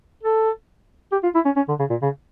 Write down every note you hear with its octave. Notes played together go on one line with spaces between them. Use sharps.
A4
G4
F4
E4
C#4
C#4
D3
C#3
A#2
C#3